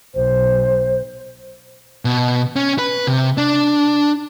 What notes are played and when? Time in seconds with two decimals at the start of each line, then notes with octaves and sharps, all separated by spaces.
0.15 B1 C5
2.05 B2
2.56 C#4
2.78 B4
3.07 C3
3.38 D4